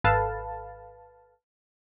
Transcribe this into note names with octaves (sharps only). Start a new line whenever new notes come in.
G#1 A4 B4 F5 A5